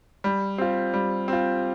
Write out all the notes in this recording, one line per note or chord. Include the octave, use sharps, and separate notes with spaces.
G3
C4 F4
G3
C4 F4